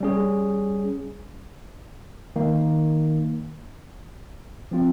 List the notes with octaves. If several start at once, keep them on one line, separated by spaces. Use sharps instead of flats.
G3 C#4 G#4
D#3 A#3 D#4
F3 C4 F4